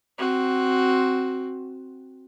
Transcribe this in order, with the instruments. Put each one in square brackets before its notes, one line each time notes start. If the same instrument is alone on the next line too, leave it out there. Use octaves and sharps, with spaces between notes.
[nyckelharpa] C4 F#4